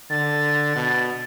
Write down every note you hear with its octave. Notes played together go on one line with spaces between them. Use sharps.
D3 A6
B2